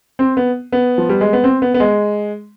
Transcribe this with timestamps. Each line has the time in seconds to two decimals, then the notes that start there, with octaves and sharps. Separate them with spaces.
0.19 C4
0.37 B3
0.72 B3
0.98 F3
1.09 G3
1.21 G#3
1.33 B3
1.44 C4
1.62 B3
1.74 B3
1.80 G#3